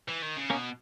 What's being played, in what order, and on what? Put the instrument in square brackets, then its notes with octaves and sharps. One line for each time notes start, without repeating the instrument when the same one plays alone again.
[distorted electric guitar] E3
D#3
C#3
[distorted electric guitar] B2 [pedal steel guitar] A#3 C#4